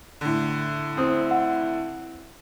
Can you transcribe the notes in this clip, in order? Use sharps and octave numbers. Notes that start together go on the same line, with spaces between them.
A2 D3
C4 E4 D#6
F#5